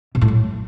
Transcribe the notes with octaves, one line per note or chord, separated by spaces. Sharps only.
B2
A2
F#3